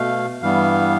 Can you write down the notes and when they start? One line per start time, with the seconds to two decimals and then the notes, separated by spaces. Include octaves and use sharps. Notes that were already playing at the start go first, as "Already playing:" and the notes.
Already playing: B2 A3 F5
0.42 G2 E3 G3 B3 F5